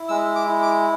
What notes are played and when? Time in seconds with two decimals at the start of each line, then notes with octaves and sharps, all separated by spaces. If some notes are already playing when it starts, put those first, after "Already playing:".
Already playing: E4
0.08 G#3 E6
0.35 D6
0.48 E4
0.62 D6